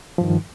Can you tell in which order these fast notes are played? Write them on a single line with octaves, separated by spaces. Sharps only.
F3 G2 D#3